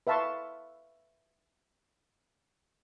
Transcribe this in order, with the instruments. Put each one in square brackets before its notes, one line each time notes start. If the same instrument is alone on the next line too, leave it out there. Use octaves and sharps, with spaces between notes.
[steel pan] B4 E5 F5 A5 C6 C#6